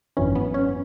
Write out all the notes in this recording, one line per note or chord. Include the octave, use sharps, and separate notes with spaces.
G#1 F#2 E3 C#4
B3
C#4